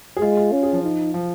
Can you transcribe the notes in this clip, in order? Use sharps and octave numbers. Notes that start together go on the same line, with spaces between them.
G#4
G#3 F4
F4
C#4
G#4
F3
D#4
F3